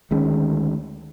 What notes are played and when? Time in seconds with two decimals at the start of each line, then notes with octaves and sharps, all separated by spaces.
0.11 D2 D#3 G#3 C#4